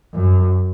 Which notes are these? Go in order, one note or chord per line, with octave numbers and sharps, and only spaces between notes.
F#2